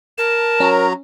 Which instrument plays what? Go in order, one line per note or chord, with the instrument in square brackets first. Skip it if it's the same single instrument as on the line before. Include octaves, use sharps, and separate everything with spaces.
[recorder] A#4 [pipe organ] A5
[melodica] F#3 A#5 [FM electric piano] C#4